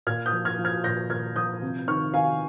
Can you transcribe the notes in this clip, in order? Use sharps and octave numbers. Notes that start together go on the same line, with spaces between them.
A#2 F6 G#6
D#6 G6
F3
F6 G#6
F3
F6 G#6
A#2 G6 A#6
A#2 F6 G#6
F3 D#6 G6
C3
D#3 C#6 F6
D#3 F5 G#5